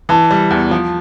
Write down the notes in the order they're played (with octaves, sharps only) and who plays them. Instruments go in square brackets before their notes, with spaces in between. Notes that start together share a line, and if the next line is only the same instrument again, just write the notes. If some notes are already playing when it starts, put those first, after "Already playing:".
[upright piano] E3 [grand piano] A5
[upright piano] G3
E2
F3